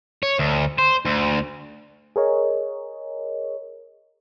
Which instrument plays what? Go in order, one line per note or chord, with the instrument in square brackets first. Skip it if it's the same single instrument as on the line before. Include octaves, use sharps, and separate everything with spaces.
[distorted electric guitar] C#5
D2
C5
D2
[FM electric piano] G#4 A#4 C#5 D#5